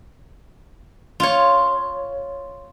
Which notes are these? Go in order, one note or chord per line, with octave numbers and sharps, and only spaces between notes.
F4 C#5